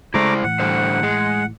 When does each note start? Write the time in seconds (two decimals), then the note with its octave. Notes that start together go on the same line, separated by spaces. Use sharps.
0.14 C#3 G#3 A3 E4 C5 D5 A#5 D6
0.44 A2 E3 F#5
0.60 D3 G3 C5
1.03 G#3 G#4